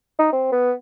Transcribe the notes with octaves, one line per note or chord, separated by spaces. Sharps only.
D#4
C4
B3